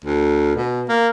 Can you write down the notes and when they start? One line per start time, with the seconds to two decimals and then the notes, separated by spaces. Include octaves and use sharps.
0.04 D2
0.56 B2
0.89 A#3